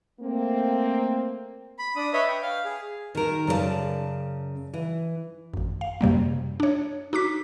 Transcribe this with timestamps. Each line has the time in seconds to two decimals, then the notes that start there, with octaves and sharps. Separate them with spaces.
0.20 A3 A#3 C4
1.79 B5
1.96 D4 D#6
2.13 B4 C#5 D#5 E5 B5
2.28 G5
2.43 F5
2.65 G#4
3.15 D#3 A#4
3.47 F#2 C#3 A#4 D5 A5
4.73 E3
5.54 G#1 F#2
5.81 F5
6.01 F#2 C3 G3 A#3
6.60 D4 C#5
7.13 D#4 F#4 D6 B6